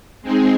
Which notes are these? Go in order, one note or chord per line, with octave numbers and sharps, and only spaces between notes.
G#3 C4 D#4 G#4